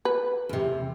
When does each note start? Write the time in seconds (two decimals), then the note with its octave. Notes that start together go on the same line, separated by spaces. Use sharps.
0.05 B4
0.49 E2 C3